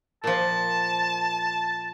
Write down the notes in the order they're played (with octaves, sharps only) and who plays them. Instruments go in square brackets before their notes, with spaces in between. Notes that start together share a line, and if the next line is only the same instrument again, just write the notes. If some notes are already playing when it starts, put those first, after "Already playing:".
[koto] A#2 F3 [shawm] A5